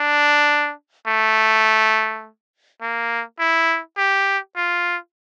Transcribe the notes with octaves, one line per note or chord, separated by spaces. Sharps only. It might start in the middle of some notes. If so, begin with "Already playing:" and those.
Already playing: D4
A3
A#3
E4
G4
F4